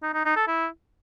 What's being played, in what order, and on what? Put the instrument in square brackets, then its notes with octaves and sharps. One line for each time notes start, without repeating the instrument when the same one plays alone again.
[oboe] D#4
D#4
D#4
A4
E4